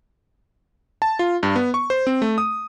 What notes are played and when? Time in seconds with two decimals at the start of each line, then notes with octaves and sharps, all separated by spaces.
1.02 A5
1.19 F4
1.43 G2
1.56 B3
1.74 C#6
1.90 C5
2.07 C4
2.22 A3
2.38 D#6